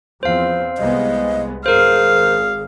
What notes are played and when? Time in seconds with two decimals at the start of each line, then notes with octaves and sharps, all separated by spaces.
0.23 E2 F3 C4 C5 F5
0.78 C2 G#3 B3 D#5
1.66 G#1 G#4 A#4 C5 F5